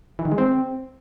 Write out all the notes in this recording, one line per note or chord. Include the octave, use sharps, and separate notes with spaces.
E3
D#3
G#3
C4